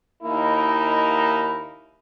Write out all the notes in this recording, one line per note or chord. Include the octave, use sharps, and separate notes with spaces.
D#2 A#3 D#4 E4